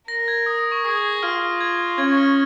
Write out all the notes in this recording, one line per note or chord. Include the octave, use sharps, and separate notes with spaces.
A#4 A#6
G#6
D#6
D#6
C#6
G#4 D#6
F4 F6
G#6
C#4 G#6
F6